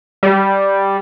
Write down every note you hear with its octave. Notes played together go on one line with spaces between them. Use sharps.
G3